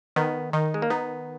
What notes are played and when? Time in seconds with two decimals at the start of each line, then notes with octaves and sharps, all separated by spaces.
0.16 D#3 B3
0.53 D#3 D#4
0.74 G#3
0.82 A#3
0.90 B3 D#4